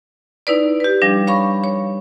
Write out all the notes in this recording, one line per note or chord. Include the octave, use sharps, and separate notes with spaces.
D#4 E4 B4 D5
G4 B4
F3 G3 D4
C#5 F5 B5 C#6
C#5